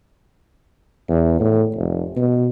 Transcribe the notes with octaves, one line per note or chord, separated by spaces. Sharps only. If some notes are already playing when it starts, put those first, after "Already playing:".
E2
A2
F1
B2